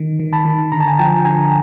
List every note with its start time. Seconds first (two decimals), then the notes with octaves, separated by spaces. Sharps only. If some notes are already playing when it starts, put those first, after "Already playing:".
Already playing: D#3
0.19 D#3
0.33 A5 B5
0.45 D#3
0.72 D3 A#5
0.80 A5
0.87 G#5 A#5
0.98 F3 G5 A5
1.25 D3 G#5 A#5